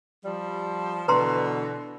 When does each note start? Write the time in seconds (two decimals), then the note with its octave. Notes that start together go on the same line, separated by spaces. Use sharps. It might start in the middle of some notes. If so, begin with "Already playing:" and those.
0.25 F3 G3
1.08 B2 D3 E3 B4 A#5 C6